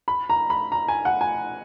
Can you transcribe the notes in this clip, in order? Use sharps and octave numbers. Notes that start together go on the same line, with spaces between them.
B5
A#5
B5
A#5
G#5
F#5
G#5